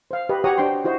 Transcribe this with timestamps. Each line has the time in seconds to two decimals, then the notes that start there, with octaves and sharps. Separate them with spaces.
0.11 C5 F5
0.29 G4 B4 D#5
0.44 F#4 G4 C#5 F#5 A#5 D#6
0.58 D4 C5 G5 C6
0.85 E4 F#4 C5 D#5